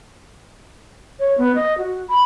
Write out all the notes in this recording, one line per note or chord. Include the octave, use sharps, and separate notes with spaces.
C#5
B3
D#5
F#4
B5